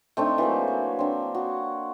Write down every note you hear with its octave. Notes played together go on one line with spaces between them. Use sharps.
A3 C4 D4 D#4
E3 F#3 A#3
C#5
C4 D4
F#4 C#5